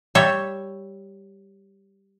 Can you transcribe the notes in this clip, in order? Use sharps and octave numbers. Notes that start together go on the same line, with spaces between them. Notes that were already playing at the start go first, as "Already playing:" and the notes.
G3 C#5 E5